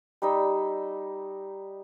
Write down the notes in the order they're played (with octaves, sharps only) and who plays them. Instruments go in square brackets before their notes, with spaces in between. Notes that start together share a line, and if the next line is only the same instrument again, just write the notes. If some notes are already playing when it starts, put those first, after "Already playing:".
[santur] G3 D#4 E6